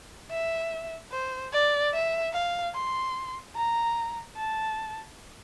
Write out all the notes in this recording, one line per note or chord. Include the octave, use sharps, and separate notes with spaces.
E5
C5
D5
E5
F5
C6
A#5
A5